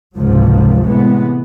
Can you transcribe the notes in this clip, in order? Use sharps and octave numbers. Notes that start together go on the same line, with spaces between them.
F#1 C#2 G#2 C3 F3 F#3
A2 C3 E3 G#3 B3